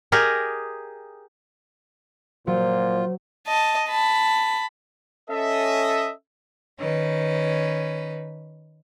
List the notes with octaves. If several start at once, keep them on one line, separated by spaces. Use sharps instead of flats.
G4 G#4 A#4 D#5
A#2 F#3 F4 C5
D#5 A5
A5 B5
C#4 A4 D#5 E5
D#3 C#4 B4